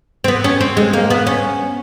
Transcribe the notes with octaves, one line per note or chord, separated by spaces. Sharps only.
C4
B3
C#4
C4
G#3
A#3
B3
C#4